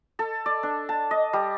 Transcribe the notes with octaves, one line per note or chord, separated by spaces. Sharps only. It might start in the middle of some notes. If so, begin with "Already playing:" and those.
A4
D5
D4
A5
D#5
G3